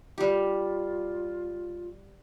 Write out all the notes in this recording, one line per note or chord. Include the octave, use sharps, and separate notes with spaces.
G3 F4 G4